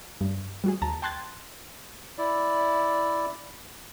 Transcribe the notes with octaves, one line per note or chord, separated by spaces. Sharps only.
G2
G3 F#4 G#4
D#2 A5 A#5
G5 A5 C6 F#6 G#6 A6
E4 D5